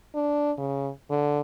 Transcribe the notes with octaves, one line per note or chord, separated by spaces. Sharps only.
D4
C#3
D3